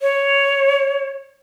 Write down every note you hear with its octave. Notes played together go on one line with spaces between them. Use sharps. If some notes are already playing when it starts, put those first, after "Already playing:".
C#5